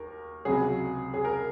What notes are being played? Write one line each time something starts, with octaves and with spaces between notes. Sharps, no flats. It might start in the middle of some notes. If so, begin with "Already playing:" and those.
Already playing: D#2 A#4
C#2 C3 F#3 G#4
G#4
A#4